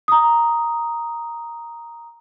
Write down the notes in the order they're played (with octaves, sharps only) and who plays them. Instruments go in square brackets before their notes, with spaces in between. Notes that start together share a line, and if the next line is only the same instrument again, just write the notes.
[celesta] A#5 D#6